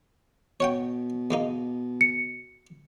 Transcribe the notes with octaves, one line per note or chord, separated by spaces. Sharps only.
B2 C#5 F#5 G5
E2 A#3 D#4
C#7